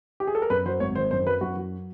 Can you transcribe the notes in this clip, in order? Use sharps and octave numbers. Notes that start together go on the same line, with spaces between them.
G4
G#4
A4
A#4
F#2 B4
F#3 C5
G#1 C#5
D#3 C5
F#2 C5
F#3 B4
F#2 F#4
F#3